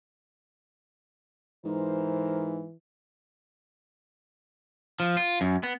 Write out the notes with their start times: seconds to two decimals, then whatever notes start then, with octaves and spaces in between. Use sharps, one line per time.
1.65 G#2 E3 A#4 C5
5.00 F3
5.17 F4
5.41 F#2
5.63 B3